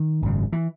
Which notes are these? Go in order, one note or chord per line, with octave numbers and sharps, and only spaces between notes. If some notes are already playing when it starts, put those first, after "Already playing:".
Already playing: D#3
G#1 F#2 C#3
E3